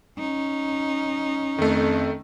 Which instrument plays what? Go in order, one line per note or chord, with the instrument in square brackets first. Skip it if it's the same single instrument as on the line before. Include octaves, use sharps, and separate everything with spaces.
[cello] C#4 D#4
[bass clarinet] F2 [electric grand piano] D#3 A3